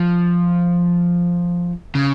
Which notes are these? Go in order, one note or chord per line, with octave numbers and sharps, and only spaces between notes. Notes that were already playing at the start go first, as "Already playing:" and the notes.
Already playing: F3
C#3